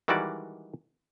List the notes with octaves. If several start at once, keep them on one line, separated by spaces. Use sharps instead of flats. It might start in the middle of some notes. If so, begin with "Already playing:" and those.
D#3 E3 G3 G#3 F#4 D5